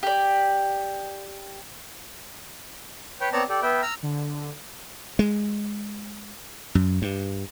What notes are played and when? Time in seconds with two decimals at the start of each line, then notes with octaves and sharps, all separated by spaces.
0.03 G4 D5
3.21 B4 C#5 G5
3.32 B3 C4 C#5 D5 A5 A#5
3.49 G4 A4 D5
3.62 B3 B4 E5 G5
3.82 A#5 E6 F6
4.03 D3
5.19 G#3
6.75 F#2
7.02 G2